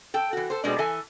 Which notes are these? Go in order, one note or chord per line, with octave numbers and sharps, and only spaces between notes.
A4 G5
E3 F#4
A4 C5
B2 G3 G#3 B3 D4 D5
E3 A4 E5 G#5